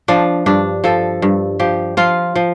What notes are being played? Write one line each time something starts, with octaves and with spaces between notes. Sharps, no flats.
F3 D4
G2 D4
F3 A4
G2
F3 G4
F3 F4
F3